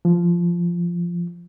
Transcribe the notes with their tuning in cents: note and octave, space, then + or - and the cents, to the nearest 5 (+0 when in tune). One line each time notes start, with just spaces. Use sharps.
F3 -10